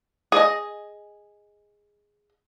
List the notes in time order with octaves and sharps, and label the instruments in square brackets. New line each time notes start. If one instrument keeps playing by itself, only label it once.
[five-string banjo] G#4 D#5